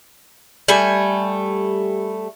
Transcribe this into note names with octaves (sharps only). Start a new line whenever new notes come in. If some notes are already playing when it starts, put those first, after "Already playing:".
G3 A3 G#5